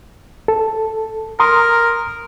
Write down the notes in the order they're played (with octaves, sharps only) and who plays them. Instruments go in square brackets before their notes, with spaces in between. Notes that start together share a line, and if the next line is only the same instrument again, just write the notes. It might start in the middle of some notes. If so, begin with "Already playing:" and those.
[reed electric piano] A4
[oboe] A#4 [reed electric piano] A#5 C6 D#6